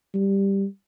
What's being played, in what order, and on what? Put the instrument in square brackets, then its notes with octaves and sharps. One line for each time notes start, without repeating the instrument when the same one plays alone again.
[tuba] G3